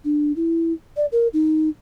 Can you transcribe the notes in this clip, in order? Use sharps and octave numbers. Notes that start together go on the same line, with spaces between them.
D4
E4
D5
A#4
D#4